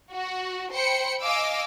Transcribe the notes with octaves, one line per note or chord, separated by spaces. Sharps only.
F#4
C5 G5 B5 C#7
D#5 F5 G#5 D6 E6